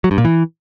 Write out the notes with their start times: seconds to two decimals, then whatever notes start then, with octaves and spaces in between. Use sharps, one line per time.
0.04 F#3
0.11 G2
0.18 A#2
0.25 E3